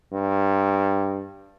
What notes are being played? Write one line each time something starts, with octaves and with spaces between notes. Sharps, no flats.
G2